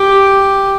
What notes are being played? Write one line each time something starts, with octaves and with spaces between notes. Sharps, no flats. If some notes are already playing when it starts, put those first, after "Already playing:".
Already playing: G4